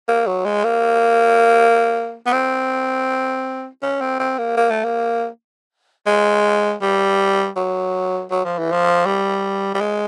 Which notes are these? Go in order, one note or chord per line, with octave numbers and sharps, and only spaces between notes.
A#3
F#3
G#3
A#3
B3
C4
C#4
C4
C4
A#3
A#3
A3
A#3
G#3
G3
F#3
F#3
F3
E3
F3
G3
G3
G#3